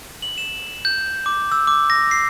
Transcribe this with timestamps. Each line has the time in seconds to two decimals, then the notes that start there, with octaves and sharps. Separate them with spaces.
0.22 F#7
0.38 E7
0.85 G6
1.26 D6
1.52 E6
1.67 D6
1.90 A#6
2.11 C7